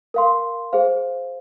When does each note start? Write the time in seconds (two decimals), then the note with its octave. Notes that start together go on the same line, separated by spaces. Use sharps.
0.14 A#4 F5 C6
0.73 G#4 C5 F5